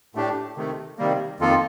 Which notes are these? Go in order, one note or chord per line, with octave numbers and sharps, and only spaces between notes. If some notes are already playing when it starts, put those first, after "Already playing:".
A2 A3 D4 G4
C3 D#3 A3
C3 D#3 G3 A#3
F2 D#3 A#3 F4 A4